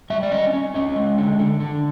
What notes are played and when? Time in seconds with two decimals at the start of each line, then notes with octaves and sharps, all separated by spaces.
0.10 G3 E5
0.23 D5
0.31 C#4 D#5
0.53 C#4
0.74 C#4 D#5
0.96 G#3
1.18 D3
1.39 D3
1.60 D3